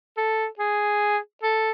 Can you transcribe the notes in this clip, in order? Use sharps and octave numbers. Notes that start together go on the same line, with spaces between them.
A4
G#4
A4